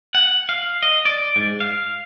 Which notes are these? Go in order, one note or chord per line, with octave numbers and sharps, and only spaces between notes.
F#5
F5
D#5
D5
G#2
F5